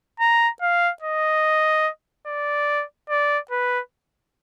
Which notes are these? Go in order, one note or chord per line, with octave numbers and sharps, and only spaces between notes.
A#5
F5
D#5
D5
D5
B4